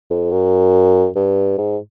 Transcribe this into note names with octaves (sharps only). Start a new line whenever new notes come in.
F2
F#2
G2
G#2